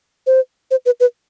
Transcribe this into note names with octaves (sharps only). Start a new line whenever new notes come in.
C5
C5
B4
B4